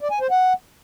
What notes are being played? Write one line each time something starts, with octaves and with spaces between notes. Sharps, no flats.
D5
G#5
C5
F#5